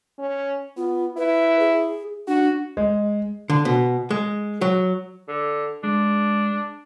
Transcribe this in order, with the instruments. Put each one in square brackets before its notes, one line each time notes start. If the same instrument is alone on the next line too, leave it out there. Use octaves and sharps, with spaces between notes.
[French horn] C#4
[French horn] B3 [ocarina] F4
[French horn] E4 [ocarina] B4
[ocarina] G#4
[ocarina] D4 [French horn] F#4
[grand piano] G#3
[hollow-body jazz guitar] D3
B2
G#3
F#3
[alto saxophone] D3
[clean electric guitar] G#3 [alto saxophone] D4